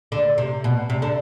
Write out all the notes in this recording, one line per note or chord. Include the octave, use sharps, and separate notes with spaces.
D3
C3
B2
C3
D3